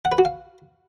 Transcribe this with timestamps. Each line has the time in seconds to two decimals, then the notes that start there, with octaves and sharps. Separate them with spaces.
0.05 F#5
0.12 B4
0.18 F#4
0.25 F5